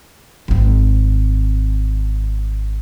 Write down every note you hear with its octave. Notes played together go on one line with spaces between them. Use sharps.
G#1 C4